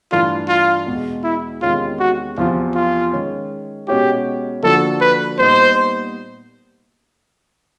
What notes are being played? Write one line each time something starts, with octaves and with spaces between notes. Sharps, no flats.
G2 E3 A3 D4 F4
F4
E2 B2 G#3
E4
E2 C3 D#3 G#3 C#4 F4
F#4
E2 C3 F3 F4
F4
D#3 G#3 C#4
B2 G#3 C#4 F#4 G4
D3 F3 A#3 D4 F#4 A4
B4
A#2 G3 B3 D#4 C5